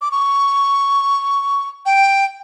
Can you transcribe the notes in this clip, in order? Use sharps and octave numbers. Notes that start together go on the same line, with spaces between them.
D6
C#6
G5